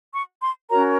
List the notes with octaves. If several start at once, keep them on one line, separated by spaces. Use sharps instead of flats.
C#6
C6
C#4 F#4 A#4 C#5 A#5